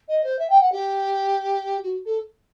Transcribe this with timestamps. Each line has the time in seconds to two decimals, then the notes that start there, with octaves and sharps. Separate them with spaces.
0.08 D#5
0.24 C5
0.39 E5
0.50 G5
0.61 F#5
0.72 G4
1.83 F#4
2.06 A4